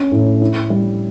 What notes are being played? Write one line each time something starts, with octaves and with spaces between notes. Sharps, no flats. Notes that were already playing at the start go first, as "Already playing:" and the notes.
Already playing: C#4
A2
E4
G3